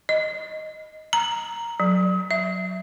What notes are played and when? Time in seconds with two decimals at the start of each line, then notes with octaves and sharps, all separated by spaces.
0.09 D#5
1.13 A#5
1.80 F#3
2.31 E5